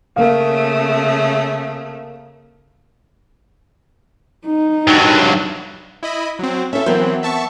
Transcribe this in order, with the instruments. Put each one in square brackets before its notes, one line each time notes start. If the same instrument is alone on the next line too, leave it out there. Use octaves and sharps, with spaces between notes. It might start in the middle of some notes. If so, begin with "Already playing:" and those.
[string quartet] C#3 A3 [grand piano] A#3 F5
[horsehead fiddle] D#4
[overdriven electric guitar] G2 F#3
[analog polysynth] E4 D#5 B5
F#3 C4
[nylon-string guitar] C#4 E4 [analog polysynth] A4 E5
[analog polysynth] E3 F#3 C4 [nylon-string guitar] B3 A#4 C5
[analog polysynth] E5 A5 C#6